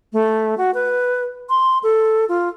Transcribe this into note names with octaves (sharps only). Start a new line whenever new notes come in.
A3
F#4
B4
C6
A4
F4